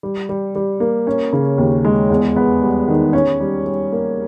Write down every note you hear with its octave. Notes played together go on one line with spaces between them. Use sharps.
G3
G3
G3
A#3
C#4
C#3
D#2
G#3
E2
B3
G3
D#3
C#4
G3
G3
A#3